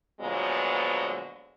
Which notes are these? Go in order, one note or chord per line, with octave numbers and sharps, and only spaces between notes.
A#2 D3 F3 F#3 G#3 B3